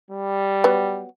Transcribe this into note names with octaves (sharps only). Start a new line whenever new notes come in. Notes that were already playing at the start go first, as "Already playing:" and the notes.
G3
F#3 B3